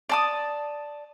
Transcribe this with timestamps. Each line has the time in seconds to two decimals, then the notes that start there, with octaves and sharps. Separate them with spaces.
0.09 D5 A5 D#6